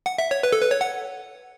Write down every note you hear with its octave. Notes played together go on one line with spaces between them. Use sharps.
F#5
E5
C#5
B4
A4
B4
C#5
F#5